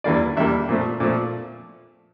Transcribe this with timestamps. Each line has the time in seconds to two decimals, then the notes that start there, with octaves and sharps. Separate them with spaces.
0.04 E2 E3 G3 A#3 D5
0.37 E2 E3 G3 A#3 E5
0.69 A#2 F3 A3
1.00 A#2 F3 A3